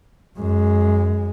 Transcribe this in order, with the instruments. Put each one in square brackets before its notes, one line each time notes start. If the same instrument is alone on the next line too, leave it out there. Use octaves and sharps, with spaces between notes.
[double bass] F#2 G#3